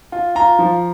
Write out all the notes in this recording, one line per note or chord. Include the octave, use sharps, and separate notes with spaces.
F4
F4 A#5
F3